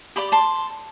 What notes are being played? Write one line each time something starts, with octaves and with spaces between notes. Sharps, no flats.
G4 D5 B5 D6
A5 C6